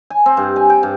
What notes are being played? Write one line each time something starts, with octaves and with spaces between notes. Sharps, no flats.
G#5
C4
G2
G#5
G5
G2